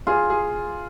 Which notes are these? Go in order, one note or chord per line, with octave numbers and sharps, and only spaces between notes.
F4 G#4
G#4